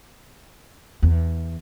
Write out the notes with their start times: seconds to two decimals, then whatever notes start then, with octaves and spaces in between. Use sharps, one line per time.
1.02 E2